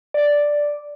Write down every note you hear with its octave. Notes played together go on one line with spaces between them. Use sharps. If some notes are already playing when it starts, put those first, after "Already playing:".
D5